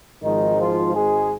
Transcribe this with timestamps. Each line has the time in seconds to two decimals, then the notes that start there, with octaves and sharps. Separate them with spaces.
0.23 G#1 G#2 D#3 F3 D#4
0.59 F3 F4
0.95 G#3 G#4